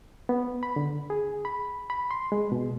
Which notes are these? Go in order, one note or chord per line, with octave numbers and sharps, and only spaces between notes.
B3
B5
D3
G#4
B5
B5
C6
G#3
B2